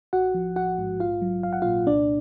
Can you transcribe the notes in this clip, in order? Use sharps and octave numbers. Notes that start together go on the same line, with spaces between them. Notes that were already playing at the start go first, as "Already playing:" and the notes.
A1 F#4 F#5
F3
A1 F#4 F#5
G#2
A#1 F4 F5
F#3
A#1 F5
F#5
F4 F5
A#2
C2 D4 D5